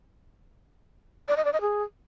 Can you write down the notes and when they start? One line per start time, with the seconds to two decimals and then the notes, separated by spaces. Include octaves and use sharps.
1.28 D5
1.36 D#5
1.45 D5
1.53 D#5
1.61 G#4